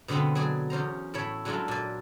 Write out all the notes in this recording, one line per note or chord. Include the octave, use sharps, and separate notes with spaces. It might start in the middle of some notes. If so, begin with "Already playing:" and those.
B2 D3 G#3 B3 C4
F#3 G#4 D5
E2 C#4 C5 A#5
A2 E4 C#5 B5
F#3 G#3 A3 D4 E4 F4
A#2 D5